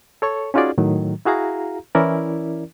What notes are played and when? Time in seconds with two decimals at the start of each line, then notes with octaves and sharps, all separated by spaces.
0.22 A4 C#5 C#6
0.54 C#4 D#4 F4 F#4 G#4 D5
0.78 A2 D#3 F#3
1.25 E4 F#4 G#4 F5 A#5
1.95 E3 C#4 E4 A#4 D5